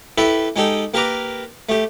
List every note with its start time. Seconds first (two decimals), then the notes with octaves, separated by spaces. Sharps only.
0.18 E4 G4 A4 B4 E5
0.56 G#3 D#4 G4 A4 G5
0.94 A#3 G4 A#4 B4 A#5 D6
1.69 A3 G4